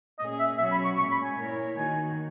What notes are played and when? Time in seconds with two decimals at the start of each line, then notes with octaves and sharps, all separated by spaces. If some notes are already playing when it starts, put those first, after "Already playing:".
0.19 A#2 A#3 C#4 G#4 D#5
0.39 E5
0.58 B2 F#3 C#4 F#4 C#5 E5
0.72 B5
0.85 C#6
0.98 A#2 G#3 C#4 C#6
1.11 B5
1.23 G#5
1.37 A#2 A#3 E4 A#4 C#5
1.76 D#3 A#3 D#4 F#4 G#5